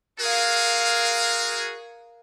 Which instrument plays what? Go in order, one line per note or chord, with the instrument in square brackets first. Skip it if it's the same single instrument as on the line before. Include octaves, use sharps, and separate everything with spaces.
[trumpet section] F#4 G#4 [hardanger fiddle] A#4 F5